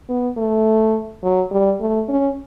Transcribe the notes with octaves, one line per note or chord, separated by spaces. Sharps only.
B3
A3
F#3
G3
A3
C#4